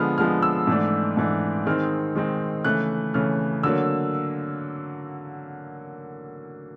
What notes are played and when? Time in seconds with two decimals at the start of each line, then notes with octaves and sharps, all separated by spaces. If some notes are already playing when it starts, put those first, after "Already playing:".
Already playing: D3 F3 G#3 B3 F6
0.18 D3 F3 G#3 B3 F6
0.43 E6
0.67 G#2 E3 A3 D4
1.17 G#2 E3 A3 D4
1.66 D#3 G#3 C4 D#4 F6
2.15 D#3 G#3 C4 D#4
2.65 C#3 E3 A3 F#6
3.14 C#3 E3 A3 F6
3.63 D3 F#3 A#3 E6